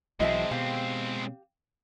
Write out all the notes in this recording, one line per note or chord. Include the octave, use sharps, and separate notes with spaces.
B1 E3 F#3 G#3 C4 D#5 E5 A5
B2 G4 F5